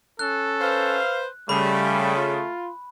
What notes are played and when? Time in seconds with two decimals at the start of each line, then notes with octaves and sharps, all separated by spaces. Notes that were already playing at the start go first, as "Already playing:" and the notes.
0.19 C#4 A4 F#6
0.61 B4 C5 F5
1.49 C#3 G3 A3 B5
2.15 F4